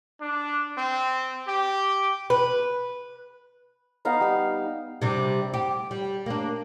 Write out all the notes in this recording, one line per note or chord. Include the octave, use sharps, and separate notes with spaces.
D4
C4
G4
B4
B3 D#4 F5 F#5
G3 D#4
C3 G3 D4
G4
G3
A#3 D4